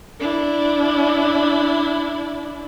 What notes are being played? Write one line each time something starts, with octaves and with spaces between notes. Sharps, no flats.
D4 E4